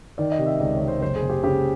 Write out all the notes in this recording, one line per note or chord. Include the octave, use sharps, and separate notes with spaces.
D#3 D5
D#5
C3
E5
C#2 D5
C#5
C3
C5
F#1 C5
G#4
F#1
G4
C#3 G4